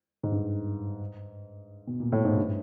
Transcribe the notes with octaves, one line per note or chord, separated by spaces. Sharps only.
G#2
G2
B2
A#2
A2
G#2
G2